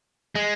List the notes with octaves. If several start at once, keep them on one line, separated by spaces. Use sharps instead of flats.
G#3